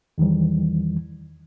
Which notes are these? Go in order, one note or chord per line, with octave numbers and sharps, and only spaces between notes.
E2 D#3 E3 G3